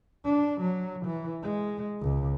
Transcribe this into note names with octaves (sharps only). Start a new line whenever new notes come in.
D4
F#3
E3
G#3
C#2